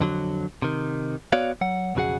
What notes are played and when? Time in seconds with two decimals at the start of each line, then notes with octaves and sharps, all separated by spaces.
0.01 F2 D3 F#3
0.62 C3 D#3
1.32 B3 F#4 C#5 D5 F5
1.61 F#3 F#5
1.95 B1 F2 C#3 F#4 G#4 F#5